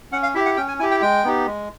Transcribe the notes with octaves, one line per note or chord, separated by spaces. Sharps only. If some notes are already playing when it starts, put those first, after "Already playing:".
C#4 F#5
F5
E4 G4 E5
F#5
C#4 G5
G#5
E4 G4 G#5
G5
G#3 G5
B3 D#4 G4
G#3